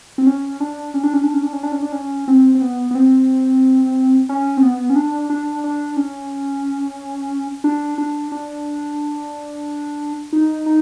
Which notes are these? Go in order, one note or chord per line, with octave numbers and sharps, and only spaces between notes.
C4
C#4
D4
C#4
D4
C#4
D4
C#4
D4
C#4
D4
C#4
D4
C#4
C4
C4
B3
B3
C4
C#4
C4
B3
C#4
D4
D4
D4
C#4
D4
D4
D4
D#4
D#4